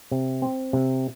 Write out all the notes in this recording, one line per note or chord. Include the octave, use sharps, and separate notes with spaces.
C3
C4
C3